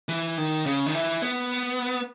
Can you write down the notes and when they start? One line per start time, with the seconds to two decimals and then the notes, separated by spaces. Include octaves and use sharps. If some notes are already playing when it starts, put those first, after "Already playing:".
0.09 E3
0.38 D#3
0.66 C#3
0.86 D#3
0.95 E3
1.22 B3